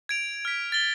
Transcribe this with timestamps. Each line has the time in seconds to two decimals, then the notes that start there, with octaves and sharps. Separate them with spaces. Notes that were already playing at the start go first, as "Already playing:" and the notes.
0.09 G#6 D7 F7
0.45 F6 B6
0.72 A6 G7